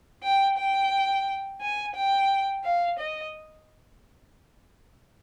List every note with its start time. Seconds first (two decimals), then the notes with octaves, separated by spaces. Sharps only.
0.23 G5
0.58 G5
1.61 G#5
1.95 G5
2.64 F5
2.99 D#5